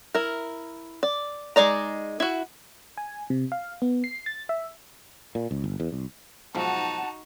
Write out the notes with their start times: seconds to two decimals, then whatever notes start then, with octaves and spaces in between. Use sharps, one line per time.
0.15 E4 A#4
1.03 D5
1.56 G#3 D#4 D5 A#5
2.20 E4 F#4
2.97 G#5
3.30 C3
3.52 F5
3.82 B3
4.04 C7
4.26 A6
4.49 E5
5.35 A#2
5.51 C#2
5.64 G1
5.80 E2
5.92 C2
6.55 B1 G#2 F3 D#4 F#4 F#5 A5